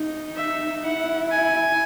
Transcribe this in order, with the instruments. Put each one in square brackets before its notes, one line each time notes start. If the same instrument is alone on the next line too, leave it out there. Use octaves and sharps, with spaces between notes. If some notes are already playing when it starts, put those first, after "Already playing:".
Already playing: [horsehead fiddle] D#4
[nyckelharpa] E5
[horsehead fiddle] E4 [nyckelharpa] F#5
[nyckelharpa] G#5